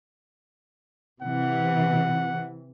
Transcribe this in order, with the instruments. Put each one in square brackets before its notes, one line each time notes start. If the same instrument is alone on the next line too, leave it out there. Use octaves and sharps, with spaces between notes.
[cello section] C3 E3 [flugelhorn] F#5